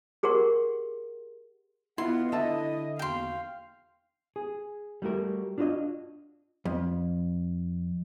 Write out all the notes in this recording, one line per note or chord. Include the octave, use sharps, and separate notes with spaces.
G4 G#4 A#4 F#5 C6
B3 E4 F4 B4 D#5 F#5 C6
D3 E4 A4 D#5 E5 A5
E2 A#3 F#4 F5 G5 C6
G#4
G3 A3 F#4 A#4
D4 F4 F#4 B4 D#5
F2